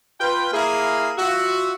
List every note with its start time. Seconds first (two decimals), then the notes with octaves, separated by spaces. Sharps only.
0.21 F4 B4 G5
0.54 A#3 E4 G#4
1.18 F4 F#4 E5